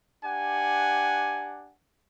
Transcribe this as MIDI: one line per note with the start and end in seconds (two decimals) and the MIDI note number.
0.23 1.72 62
0.23 1.72 67
0.23 1.72 78
0.23 1.72 80